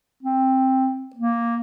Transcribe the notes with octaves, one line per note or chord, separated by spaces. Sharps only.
C4
A#3